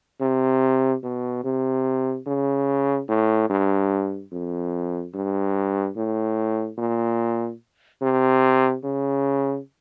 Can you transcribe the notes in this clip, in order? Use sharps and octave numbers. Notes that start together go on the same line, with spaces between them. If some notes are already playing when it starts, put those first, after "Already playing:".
C3
B2
C3
C#3
A2
G2
F2
G2
A2
A#2
C3
C#3